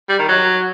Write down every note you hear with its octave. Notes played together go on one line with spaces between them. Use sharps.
G3
D#3
F#3